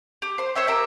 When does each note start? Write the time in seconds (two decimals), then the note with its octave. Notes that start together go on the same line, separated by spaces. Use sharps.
0.22 G4
0.38 C5 C6
0.55 C5 C#5 E5 G5
0.67 G4 A#4 E5